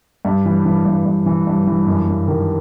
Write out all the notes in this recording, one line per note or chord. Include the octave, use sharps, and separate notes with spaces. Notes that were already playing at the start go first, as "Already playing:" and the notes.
G2
E3
E3
G2
G2
E3
G2
E3
F#2
F#2
D#3